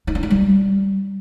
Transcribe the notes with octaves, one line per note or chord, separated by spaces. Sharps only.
D#4
D4
F4
G3